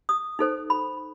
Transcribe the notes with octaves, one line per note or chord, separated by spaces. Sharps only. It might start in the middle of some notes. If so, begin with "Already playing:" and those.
D#6
D#4 A4 C5
B5